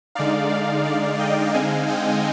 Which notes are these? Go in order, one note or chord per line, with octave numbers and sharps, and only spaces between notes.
D3 G#3 D#4 D5 F5
D5 F5
D5 F5
D#5 G5
D3 G#3 C4 D#4 F5 G#5
D#5 G5